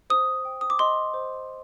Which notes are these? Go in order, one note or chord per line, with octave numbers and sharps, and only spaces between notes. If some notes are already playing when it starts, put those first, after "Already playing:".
C5 D#6
G5
D#6
D6
D#5 C6
C5